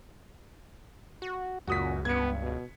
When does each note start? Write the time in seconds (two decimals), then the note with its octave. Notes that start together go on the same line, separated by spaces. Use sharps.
1.22 F#4
1.67 C#2 F#2 A#2 F#4 D#6 B6
2.05 G2 B3 G#6 C#7
2.42 B2